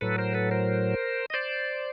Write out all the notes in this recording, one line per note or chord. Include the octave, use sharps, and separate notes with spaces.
A2 F#3 A4 B4
A#4 C5
A4 B4
A#4 C5
D#5
C5 D5